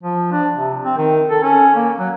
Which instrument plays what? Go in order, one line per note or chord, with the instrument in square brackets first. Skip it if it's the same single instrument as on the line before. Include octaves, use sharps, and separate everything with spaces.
[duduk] F3
D4
C3
C4
D#3
A4
C#4
A#3
F#3